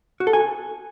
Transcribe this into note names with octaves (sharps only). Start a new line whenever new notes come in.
F#4
A4
G#5